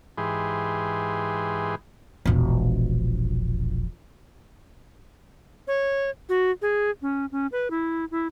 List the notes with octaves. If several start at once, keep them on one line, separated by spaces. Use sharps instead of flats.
G#2 E3 G4 G#4 B4 C6
E1 A#1
C#5
F#4
G#4
C#4
C#4
B4
E4
E4